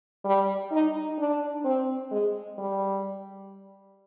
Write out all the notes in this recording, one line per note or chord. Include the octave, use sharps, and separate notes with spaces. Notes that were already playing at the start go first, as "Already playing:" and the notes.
G3
D#4
D4
C4
G#3
G3